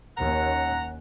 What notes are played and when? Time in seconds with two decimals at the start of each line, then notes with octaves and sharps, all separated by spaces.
0.17 D#2 C#4 F#5 A#5